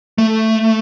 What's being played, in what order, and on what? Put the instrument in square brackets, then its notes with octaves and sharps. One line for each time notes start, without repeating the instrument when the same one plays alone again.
[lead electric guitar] A3